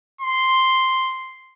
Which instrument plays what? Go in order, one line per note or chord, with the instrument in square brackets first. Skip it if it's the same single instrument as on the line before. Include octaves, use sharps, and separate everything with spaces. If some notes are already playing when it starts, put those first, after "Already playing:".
[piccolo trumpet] C6